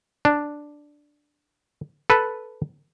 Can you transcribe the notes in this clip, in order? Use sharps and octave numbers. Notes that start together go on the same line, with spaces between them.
D4
A4 B4